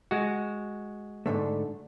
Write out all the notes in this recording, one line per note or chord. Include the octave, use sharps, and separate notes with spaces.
G#3 F#4
G#2 D3 A3